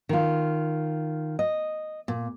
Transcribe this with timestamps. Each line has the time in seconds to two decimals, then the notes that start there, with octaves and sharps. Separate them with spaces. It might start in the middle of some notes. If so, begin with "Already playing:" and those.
0.09 D#3 F4
1.39 D#5
2.08 A#2